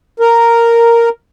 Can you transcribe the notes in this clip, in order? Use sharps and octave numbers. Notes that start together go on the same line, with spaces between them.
A#4